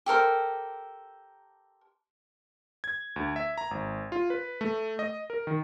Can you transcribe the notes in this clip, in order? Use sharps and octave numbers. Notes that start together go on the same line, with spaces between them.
G4 A4 A#4 C5
G#6
D2
E5
A#5
G#1
F4
B4
A3
D#5
A#4
D#3